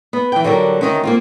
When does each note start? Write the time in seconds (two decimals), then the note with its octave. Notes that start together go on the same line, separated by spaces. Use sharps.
0.13 B3
0.32 E3 G5
0.44 D3 F#3 G3 A#4
0.81 D2 D#3 C#4
1.04 A#3 C4 F4